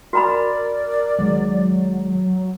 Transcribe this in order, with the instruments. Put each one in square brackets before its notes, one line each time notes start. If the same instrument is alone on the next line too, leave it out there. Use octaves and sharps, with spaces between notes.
[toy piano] F#4 A#5 B5 [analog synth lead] A#4 [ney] D5
[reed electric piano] C#2 D#3 G#3 [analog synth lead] F#3